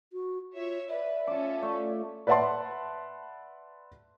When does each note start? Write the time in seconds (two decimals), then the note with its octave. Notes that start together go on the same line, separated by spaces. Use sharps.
0.13 F#4
0.55 F4 C#5 E5
0.89 B4 D5 E5
1.27 C#4 F4 A4 D6
1.62 A3 D5
2.27 B4 D5 E5 F#5 A5 C6